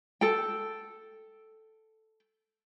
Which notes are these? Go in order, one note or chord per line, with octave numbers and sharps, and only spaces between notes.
A4 G5